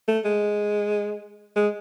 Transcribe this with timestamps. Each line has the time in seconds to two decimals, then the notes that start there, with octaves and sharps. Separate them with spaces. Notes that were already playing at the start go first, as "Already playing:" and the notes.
0.08 A3
0.25 G#3
1.56 G#3